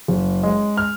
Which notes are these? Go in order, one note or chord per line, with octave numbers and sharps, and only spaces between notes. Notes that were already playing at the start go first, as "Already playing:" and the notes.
F#1
G#3
F6